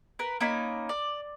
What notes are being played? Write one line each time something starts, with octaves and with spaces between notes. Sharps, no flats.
A#4 B4
A#3 C#4 D#4 B5
D5